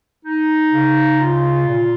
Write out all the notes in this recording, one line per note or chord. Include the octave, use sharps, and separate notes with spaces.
D#4
C#3
F4
A#2